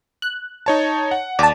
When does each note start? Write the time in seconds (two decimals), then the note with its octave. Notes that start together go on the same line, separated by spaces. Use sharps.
0.22 F#6
0.66 D#4 C#5 A5
1.11 F#5
1.39 D#2 D5 A5